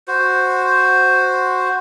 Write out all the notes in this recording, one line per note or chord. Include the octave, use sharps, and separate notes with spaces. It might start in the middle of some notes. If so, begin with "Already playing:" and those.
F#4 C5